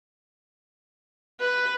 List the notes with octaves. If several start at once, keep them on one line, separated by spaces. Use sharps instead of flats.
B4